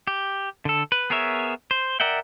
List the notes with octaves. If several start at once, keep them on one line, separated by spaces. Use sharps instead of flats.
G4
D3 A4
B4
B3 G#4 A#4 C#5 E5
C5
A#4 D5 E5 F#5 G5